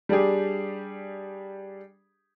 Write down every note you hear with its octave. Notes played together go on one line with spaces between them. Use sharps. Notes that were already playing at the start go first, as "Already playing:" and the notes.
G3 D4 G4 G#4